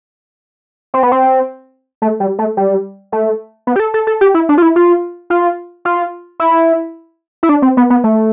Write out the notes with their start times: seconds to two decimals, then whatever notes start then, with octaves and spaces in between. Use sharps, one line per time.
0.94 C4
1.03 B3
1.12 C4
2.02 A3
2.20 G3
2.39 A3
2.57 G3
3.12 A3
3.67 B3
3.76 G4
3.80 A4
3.94 A4
4.07 A4
4.21 G4
4.34 E4
4.49 D4
4.58 F4
4.62 E4
4.76 F4
5.30 F4
5.85 F4
6.40 E4
7.43 E4
7.49 D4
7.62 C4
7.77 B3
7.90 B3
8.04 A3